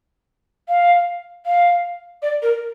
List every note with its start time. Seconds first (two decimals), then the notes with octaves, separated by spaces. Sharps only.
0.69 F5
1.46 F5
2.22 D5
2.42 A#4